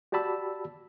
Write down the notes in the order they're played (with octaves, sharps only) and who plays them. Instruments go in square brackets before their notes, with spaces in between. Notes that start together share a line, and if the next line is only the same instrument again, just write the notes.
[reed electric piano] F#4 G4 D5 A5 B5 E6